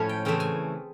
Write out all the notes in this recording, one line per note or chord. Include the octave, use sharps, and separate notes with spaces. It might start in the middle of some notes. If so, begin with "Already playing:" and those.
Already playing: A2 F3 A3 C#4 C#5
G5
C#3 E3 A3 C4 G5
G#5